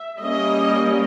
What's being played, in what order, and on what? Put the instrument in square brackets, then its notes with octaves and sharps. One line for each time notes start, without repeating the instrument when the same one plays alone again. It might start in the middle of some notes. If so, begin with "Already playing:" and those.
Already playing: [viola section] E5
G3 A#3 C#4 D#5